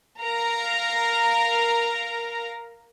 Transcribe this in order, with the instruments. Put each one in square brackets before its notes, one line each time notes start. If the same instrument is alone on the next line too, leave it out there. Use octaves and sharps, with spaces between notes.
[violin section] A#4 F5 A#5